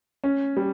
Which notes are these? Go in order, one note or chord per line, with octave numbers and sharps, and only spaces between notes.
C#4
G3